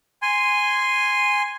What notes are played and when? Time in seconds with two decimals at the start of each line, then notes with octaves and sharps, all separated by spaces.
0.22 G#5 C6